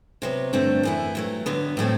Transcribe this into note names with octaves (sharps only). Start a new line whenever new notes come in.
C3 F#3 B3
G2 D3 F#3 A3 C4
F#2 E3 A3 E4
G2 F#3 A3
G2 D3 F#3 B3
A2 F#3 A3 C4